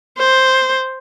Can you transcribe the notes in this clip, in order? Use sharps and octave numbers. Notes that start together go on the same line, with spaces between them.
C5